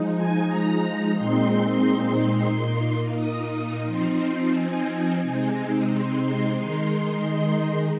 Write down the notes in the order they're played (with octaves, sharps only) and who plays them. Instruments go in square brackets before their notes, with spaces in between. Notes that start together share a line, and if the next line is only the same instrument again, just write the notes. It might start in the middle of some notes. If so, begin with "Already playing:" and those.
Already playing: [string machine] F3 G#3 D#4
G#5
A#5
A#2 G#3 C4 D#4 C6
A#2 A#3 D#4
D#6
F3 C4 D#4 C6
G#5
C3 G#3 C4 D#4
C6
C6
D#3 G#3 D#4 C6